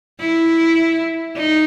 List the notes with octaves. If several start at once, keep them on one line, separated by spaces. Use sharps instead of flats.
E4
D#4